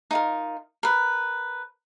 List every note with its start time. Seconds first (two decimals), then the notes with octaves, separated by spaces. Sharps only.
0.11 D#4 F4 A#4
0.83 A#4 B4